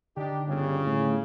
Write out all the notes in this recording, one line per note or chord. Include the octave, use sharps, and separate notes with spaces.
D3 D4 D#4 G4
G1 C#3
A2